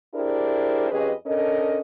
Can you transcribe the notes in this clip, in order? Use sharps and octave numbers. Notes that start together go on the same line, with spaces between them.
D4 E4 G4 G#4 A#4 C5
F2 C#4 G4 G#4 B4 D#5
C#4 D4 A4 A#4 D#5